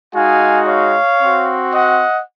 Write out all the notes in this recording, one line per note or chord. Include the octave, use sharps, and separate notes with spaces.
G#3 D#4 F#4 F5 G#5
C#5 F5
C4 F#4
D#5 F#5